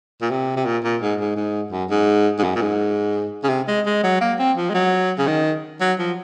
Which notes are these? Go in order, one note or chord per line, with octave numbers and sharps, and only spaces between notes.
A#2
C3
C3
A#2
A#2
G#2
G#2
G#2
F#2
G#2
G#2
F#2
A#2
G#2
C#3
C3
G#3
G#3
F#3
A#3
C4
F3
G#3
F#3
C#3
D#3
F#3
F3